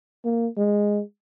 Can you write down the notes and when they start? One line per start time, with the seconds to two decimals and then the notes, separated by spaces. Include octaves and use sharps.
0.25 A#3
0.57 G#3